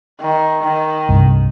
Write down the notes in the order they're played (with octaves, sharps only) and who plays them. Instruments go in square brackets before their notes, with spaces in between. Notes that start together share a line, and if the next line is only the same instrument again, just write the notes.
[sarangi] D#3
D#3
[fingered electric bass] C2 G2